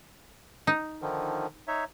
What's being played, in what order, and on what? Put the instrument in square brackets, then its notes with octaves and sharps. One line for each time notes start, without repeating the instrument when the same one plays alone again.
[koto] D#4
[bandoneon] D3 D#3 F3
D#4 C#5 E5